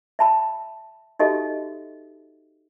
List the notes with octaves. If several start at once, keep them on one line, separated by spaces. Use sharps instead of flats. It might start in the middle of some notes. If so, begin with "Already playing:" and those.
E5 A5 B5
D#4 F#4 G4 A4 D#5 E5